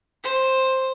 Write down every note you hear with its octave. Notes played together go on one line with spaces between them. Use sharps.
C5